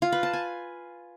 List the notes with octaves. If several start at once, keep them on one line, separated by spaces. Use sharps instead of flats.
F4
B4
A5
G#5